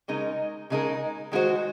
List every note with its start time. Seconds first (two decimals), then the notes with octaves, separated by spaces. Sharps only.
0.08 C#3 G#3 D#4 A#4
0.70 C#3 G#3 D#4 A#4
1.32 D#3 G#3 D#4 F#4 C5